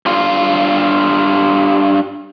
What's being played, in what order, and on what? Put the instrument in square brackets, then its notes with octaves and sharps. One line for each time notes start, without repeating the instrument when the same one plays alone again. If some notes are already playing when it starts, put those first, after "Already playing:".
[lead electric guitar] G2 F4